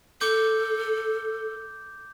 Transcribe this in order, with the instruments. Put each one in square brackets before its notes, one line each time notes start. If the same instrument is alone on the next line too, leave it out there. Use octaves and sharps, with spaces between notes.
[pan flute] A4 [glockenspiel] D6 G6